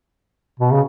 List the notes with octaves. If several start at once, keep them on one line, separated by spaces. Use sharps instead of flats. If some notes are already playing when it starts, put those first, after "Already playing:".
B2
C#3